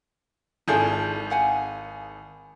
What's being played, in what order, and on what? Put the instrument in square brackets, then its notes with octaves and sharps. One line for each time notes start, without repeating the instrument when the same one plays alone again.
[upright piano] G#1 G#4 G6 [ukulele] E4 F4 A4
[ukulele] F5 F#5 G#5